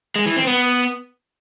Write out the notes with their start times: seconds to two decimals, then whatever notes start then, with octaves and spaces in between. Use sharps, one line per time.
0.16 G#3
0.26 E3
0.36 C4
0.47 B3